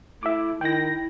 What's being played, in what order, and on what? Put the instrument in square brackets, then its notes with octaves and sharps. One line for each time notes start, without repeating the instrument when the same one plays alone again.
[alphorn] A3 [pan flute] E4 [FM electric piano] E5 D6
[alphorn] D#3 [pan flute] E4 [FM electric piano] G5 A#6